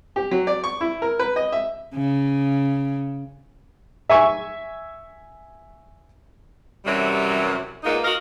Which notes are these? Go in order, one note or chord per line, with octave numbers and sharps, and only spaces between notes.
G4
F#3
D5
C#6
E4
A#4
B4
D#5
E5
C#3
E5 G#5 C#6
F#2 C3 E3 F#3 G3
A#2 G#3 A#3 B3 D#4
F#4 A#4 D#5 F5